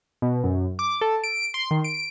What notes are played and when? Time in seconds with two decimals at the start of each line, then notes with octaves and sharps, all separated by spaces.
0.22 B2
0.44 F#2
0.79 D6
1.01 A4
1.24 D7
1.54 C6
1.71 D#3
1.84 D7